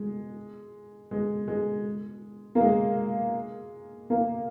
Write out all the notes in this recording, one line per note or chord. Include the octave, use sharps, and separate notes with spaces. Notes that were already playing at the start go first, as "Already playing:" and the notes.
Already playing: G#3
G#3
G#3
A#3
G#3
A#3